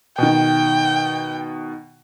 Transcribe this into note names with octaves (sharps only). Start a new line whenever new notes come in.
B2 D#3 G5